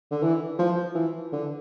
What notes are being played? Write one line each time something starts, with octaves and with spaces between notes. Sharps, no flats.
D3
E3
F3
E3
D3